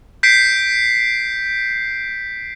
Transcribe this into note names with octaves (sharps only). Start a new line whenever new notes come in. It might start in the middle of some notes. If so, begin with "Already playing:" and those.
G6 B6 C7 D7